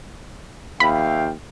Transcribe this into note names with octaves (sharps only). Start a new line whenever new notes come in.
D#2 E5 F5 G5 B5